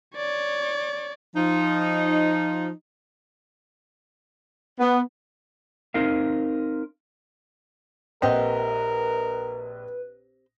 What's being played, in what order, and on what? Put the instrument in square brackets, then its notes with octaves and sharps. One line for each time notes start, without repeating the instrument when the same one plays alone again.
[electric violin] C#5 D5
[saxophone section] F3 D#4
[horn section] B3
[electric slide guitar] C4 D#4 A#4 F5
[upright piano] A#1 D#5 F#5 [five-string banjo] C4 G4 [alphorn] A#4 [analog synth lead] B4